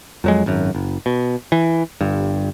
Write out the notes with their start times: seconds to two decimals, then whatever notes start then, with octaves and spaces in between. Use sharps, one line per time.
0.24 F2 F#3 G#3
0.46 G#1 F#2
0.75 F#1
1.06 B2
1.52 E3
2.01 G1 G2